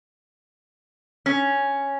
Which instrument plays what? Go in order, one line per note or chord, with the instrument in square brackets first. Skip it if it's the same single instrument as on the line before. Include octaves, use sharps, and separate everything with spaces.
[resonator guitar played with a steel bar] C#4